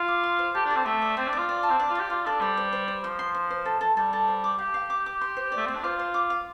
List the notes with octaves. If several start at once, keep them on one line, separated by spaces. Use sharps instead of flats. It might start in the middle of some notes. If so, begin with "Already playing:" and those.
Already playing: F4
D6
C6
C5
G4 A4
D4
A4
C4
A3 A4
D5
C4 D5
D4
F4 D5
D5
A5
C4
D4 D5
F4
G4 D5
F4 F5
D4 A4
G3 C5
C5
C5
C5
F3 C6
C6
C5
C5
A4
A4
G3 A4
A4
C5
D6
G4 F5
F5
D6
D6
C6
C5
D5
A3
C4 D5
D4
F4 C5
C5
D6
F5